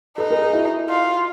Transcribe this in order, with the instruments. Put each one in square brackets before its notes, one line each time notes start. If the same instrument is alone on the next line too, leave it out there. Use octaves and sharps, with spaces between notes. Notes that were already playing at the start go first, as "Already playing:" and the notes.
[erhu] D#4 [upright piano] A4 B4
[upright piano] G#4 A#4
G#4 A#4
E4 F#4
[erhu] F4